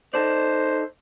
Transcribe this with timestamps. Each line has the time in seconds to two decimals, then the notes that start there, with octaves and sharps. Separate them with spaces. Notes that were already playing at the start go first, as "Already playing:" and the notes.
0.14 D#4 A4 C5 D5